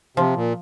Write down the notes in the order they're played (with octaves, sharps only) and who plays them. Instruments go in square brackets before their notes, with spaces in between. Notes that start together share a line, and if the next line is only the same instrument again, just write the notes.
[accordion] C3 [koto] F3
[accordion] A#2